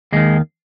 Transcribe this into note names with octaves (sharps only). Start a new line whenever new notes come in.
D#2 D#3 G#3